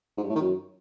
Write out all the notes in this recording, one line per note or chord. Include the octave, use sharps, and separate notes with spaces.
G#2
G2
A2
D#3
F#2